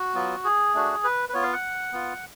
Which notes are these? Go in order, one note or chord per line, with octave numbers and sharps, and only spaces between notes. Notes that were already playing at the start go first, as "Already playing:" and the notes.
Already playing: F#4
F#3 B3 F4
G#4
A3 D4 F#4
B4
B4
B3 F4 C#5
F5
F#5
B3 F4